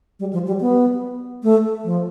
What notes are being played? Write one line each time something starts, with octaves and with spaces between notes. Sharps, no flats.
G3
F3
G3
B3
A3
F3